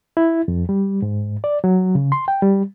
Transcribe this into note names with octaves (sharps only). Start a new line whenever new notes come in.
E4
F2
G3
G#2
D5
F#3
C#3
C6
G5
G3